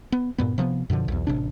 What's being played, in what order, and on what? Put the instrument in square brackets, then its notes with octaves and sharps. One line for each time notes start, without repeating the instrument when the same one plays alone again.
[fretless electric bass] B3
G2 A#2 B3
C3 F3 G#3 B3
F#2 B2 D3 F3
B1 E2
A1 C3 D4